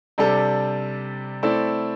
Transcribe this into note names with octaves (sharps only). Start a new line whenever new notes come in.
C3 G3 D4 A4
A3 C4 E4 A4 D5